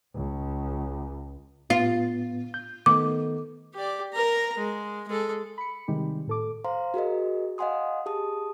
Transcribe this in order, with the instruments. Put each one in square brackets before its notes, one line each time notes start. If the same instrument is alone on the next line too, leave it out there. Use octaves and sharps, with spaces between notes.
[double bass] C#2
[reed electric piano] A2 B3 A6 [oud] F4
[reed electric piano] G6
[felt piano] D#3 A3 B3 [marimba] D6
[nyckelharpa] G4 D5
A#4 A#5
G#3
G#3 A4
[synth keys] B5 C#7
C3 D#3 G3 G#3 D#4 G4
A2 A4 D6
[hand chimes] C5 F5 A#5 C6
F#4 G#4 A#4 D#5
D#5 F5 F#5 G#5 C6 D#6
G4 G#4 A5 D#6